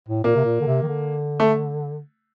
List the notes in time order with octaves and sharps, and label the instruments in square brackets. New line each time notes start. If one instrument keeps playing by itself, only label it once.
[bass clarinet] A2
[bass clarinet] A#2 [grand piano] A#3
[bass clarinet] C3
A#2
D3
C3
D#3
D3
[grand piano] A3